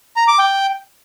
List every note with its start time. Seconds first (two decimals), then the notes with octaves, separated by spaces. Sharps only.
0.16 A#5
0.28 D6
0.39 G5